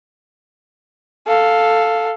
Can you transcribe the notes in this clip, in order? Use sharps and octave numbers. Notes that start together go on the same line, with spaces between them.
A4 F5